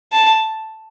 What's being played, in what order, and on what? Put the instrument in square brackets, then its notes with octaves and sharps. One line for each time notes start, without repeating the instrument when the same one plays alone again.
[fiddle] A5